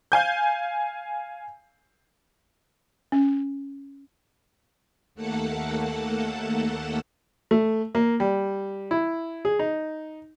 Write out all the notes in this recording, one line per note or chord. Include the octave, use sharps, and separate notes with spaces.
F5 G#5 G6
C#4
D#2 A3 A#3 A4 F#5 A5
A3
A#3
G3
E4
G#4
D#4